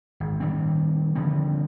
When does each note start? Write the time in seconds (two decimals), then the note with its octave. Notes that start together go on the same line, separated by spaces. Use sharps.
0.20 G#1
0.40 D#3 G3 C4
1.16 D3 F3 G3 C4